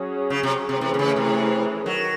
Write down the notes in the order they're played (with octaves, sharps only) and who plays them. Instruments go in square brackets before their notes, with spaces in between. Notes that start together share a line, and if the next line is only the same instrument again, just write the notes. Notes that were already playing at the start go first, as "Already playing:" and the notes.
Already playing: [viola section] F#3 C#4 G#4
[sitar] C#3
C3
C3
[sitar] C3 [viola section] E3 A3 C#4 G#4
[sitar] C3
C#3
C3
[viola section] D#3 [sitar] F#3